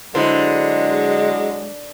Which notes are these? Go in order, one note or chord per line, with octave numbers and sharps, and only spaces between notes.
D3 F#3 G#3 E4 C5